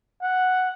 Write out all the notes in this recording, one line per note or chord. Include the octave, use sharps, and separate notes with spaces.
F#5